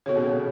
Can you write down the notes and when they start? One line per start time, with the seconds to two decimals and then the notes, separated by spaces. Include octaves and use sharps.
0.06 C#3 B3 F#4 A4 C#5
0.16 B2
0.26 C#3